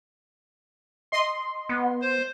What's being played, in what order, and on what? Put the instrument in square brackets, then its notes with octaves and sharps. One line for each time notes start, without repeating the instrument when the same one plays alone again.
[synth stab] D#5 C6
[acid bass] B3
[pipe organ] C5